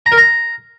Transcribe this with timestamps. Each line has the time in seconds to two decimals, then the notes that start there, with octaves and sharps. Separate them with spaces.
0.06 A#5
0.12 A#4
0.17 A#5